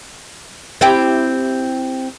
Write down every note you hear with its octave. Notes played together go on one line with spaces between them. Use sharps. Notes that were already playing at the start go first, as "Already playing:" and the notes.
C4 E4 G4